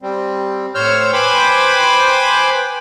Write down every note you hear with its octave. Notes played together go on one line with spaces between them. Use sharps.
G3 C4
A2 C5 C#5 E6 F6 G6
B4 C5 G5 G#5 B5 D6